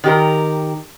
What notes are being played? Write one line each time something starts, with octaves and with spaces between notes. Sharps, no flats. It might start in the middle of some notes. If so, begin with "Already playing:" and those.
D#3 G4 A#4